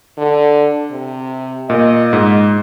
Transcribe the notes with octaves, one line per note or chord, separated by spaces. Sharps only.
D3
C3
A#2 D#5
G#2